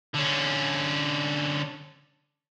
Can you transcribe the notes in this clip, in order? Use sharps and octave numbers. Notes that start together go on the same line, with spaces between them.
D3 C#4